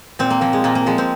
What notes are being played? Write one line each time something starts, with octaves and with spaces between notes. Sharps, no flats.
A#2 C4
A#3
F3 A#3
G#3
A#2 A#3
A#3
F3 G#3
C4